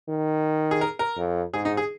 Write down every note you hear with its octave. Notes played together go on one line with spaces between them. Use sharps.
D#3
G#4
A#4
A#4
F2
G#2 G#4
D#4
G#4